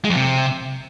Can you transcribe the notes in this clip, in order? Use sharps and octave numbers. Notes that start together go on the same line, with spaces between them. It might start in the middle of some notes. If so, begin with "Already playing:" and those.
G#3
F2
C3